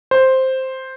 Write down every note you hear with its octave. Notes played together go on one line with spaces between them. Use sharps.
C5